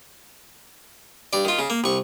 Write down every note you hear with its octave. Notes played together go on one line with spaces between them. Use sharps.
G2 D5
D#3 F4
C#3
A#3
C2 C#6